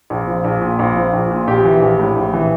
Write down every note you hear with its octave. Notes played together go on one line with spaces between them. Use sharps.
A#1
F3
A#1
A#2
A#1
F3
A#1
A#2
A#1 G4
E3
A#1
A2
A#1
E3